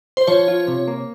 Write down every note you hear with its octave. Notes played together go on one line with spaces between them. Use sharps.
C5
F3 C#5
F4
C3
A#3